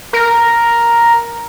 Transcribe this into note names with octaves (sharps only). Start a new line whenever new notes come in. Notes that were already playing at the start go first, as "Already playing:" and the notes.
A#4